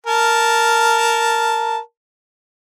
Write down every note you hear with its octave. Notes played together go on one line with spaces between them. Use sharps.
A#4 A5